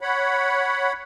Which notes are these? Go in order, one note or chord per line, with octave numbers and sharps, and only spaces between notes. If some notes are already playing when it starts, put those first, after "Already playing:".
C#5 F#5 B5